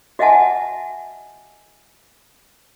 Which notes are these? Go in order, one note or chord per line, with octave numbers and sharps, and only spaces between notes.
F#4 D#5 E5 F#5 G#5 A5